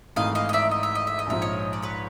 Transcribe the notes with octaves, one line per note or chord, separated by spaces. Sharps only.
G#1 G#2 E3 A3 D#5 F5
D#5 F5
D#5
D5 E5
D#5
E5
D#5
E5
D#5
A#1 G#2 F3 E5
C#5 D#5
D5
B4 C#5